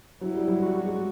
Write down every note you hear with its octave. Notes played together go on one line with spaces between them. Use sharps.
F#3 E4
G3
F#3
G3 F#4
G#3